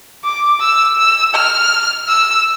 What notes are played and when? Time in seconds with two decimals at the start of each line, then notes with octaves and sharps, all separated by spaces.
0.24 D6
0.61 E6
0.98 E6
1.35 F6
2.08 E6